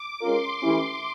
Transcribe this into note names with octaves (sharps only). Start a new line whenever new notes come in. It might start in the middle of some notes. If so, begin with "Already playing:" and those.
Already playing: D6
G#3 C#4 F4 A#4 C6
E3 A3 C#4 E4 G4